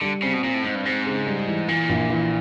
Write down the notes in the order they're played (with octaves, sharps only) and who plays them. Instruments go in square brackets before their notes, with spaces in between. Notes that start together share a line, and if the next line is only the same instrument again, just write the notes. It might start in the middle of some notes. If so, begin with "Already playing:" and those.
[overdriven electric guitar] D3 [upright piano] G3
[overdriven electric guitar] C#3 [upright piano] C4
[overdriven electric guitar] B2
[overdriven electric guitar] A#2 [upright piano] C4
[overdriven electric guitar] A2
[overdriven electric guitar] G#2 [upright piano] C4
[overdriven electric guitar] G2
[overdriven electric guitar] G#2 [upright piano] C4
[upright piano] C#3
G3
E3
[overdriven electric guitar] A#2 [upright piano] E3
[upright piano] A#1
E3